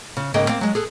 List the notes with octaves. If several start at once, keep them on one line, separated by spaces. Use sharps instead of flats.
C#3
G#2 C#3 A#3 G#4 D#5 G5
A#3 C4 F5 G5
F#3 G#3
G#4 A4 B4